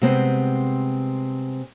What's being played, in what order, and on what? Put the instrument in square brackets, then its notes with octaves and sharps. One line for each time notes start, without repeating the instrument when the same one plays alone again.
[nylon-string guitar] C3 G3 G#3 B3 C4